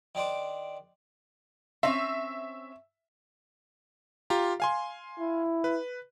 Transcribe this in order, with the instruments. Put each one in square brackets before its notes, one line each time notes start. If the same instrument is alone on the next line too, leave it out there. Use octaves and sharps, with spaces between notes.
[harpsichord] D#3 D4 C5 D6
[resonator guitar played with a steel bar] C4 C#4 [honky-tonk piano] E5
[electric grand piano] F4 G4 A#5
F5 G#5 C6
[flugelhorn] E4
[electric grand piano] B4